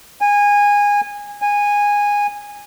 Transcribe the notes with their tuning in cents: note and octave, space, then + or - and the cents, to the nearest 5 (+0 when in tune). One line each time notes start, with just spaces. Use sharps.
G#5 -20
G#5 -15